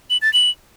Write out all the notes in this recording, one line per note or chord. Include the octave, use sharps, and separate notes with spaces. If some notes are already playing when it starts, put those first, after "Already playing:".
F#7
A6
F#7